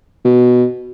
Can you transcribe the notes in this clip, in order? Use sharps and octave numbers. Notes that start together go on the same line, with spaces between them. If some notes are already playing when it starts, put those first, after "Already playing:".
B2